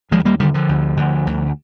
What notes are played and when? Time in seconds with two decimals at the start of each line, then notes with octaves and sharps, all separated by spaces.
0.11 D#2 F3 G#3
0.25 G3 A#3
0.40 D3 D#3 G3
0.54 D3 F3
0.69 D2
0.97 D2
1.27 D2